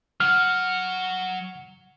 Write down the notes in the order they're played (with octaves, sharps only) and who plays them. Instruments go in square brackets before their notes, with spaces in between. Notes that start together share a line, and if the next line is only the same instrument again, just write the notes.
[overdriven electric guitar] F#3 F#5 [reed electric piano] F6